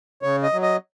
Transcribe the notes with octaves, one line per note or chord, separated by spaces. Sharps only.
C#3 C#5
D#5
F#3
D#5